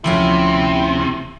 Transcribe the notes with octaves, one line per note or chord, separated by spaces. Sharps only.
D2 C3 F3 C#4 E4